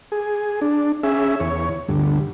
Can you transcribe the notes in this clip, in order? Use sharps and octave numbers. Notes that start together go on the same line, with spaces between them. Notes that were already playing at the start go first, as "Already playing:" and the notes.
G#4
D4
C#4 G#4 E5
E2 C#5
D2 G2